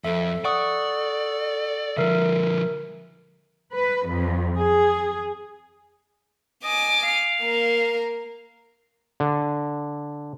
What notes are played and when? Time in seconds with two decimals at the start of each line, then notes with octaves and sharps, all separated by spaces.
0.04 F2 A4 E5
0.45 D5 F#5 C#6 D#6
1.97 D3 F3 A#4 E5
3.73 B4
4.05 F2
4.61 G#4
6.64 D#5 G#5 D6
7.04 F5
7.42 A#3 A#4
9.20 D3